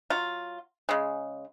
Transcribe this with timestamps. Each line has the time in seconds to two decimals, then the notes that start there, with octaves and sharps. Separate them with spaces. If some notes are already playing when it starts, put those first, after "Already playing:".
0.10 F#3 F4
0.89 C#3 G#3